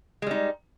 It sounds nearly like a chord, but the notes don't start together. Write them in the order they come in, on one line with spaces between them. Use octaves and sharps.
G#3 G3 D#4